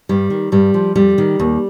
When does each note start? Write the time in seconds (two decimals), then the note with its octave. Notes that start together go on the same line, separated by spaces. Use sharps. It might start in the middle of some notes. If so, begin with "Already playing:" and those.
0.09 G2 G3
0.30 D#3
0.52 G2 G3
0.74 F3
0.95 F2 G3
1.18 D#3
1.40 D#2